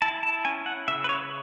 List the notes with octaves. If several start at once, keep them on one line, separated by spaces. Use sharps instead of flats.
E4 A5
A5
C#4 G#5
F#5
C#3 E5
B4
C#5